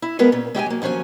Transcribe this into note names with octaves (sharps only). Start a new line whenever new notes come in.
E4
G3 G#3 B3 A#4 B4
A#2 C#4
G#3 G4 E5 G#5
F#3 A#3
D#2 F3 F#3 C#4 G#5